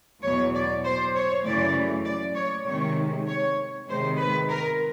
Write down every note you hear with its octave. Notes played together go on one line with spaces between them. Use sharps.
E2 B2 F#3 C#5
D5
C5
C#5
F#2 C#3 E3 A3 D5
D5
C#5
C3 D#3 G#3 C#5
C#5
C3 D#3 G#3 C5
B4
A#4